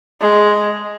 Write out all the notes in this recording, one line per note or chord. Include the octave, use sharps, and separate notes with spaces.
G#3